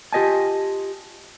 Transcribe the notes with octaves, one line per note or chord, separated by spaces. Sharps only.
F4 G4 A4 D#5 G#5 A5